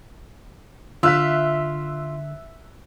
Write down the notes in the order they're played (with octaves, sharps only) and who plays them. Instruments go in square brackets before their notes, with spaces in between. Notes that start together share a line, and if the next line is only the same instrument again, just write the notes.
[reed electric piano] D3 [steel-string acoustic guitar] F4 [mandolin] E5 [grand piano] E6 F#6 B6